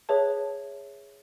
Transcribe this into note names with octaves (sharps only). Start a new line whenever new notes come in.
G#4 B4 C#5 E5 A5